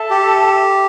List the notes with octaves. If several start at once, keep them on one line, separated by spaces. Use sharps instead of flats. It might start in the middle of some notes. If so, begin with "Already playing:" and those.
Already playing: A4 E5 A5
G4